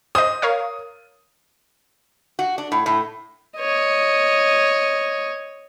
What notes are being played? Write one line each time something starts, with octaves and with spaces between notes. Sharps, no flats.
C5 D#5 D#6
A#4 C#5 F5
F#4
D4
A2
A2
C#5 D#5